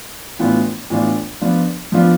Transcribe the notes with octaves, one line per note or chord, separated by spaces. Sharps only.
A2 E3 B3 D4 F4
A2 E3 B3 D4 F4
F3 B3 D4 F4
F3 B3 D4 F4